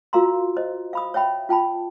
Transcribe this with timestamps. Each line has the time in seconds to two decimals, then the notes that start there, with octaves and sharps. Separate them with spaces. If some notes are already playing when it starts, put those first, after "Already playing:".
0.13 F4 F#4 A#4 F5 A#5 C6
0.57 C5 D#5
0.93 F5 B5 D#6
1.14 C#5 E5 G5 B5
1.49 F4 G5 A5 B5